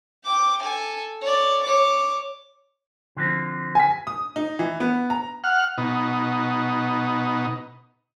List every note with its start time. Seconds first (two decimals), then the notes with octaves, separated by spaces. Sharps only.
0.24 G5 D6
0.62 A4 G#5
1.21 C#5 D5
1.63 C#5 D6
3.17 D3 F3 C4
3.75 G#5 B6
4.07 D#6
4.36 D#4
4.59 E3
4.80 B3
5.10 A#5
5.44 F#5 F6
5.78 B2 D#4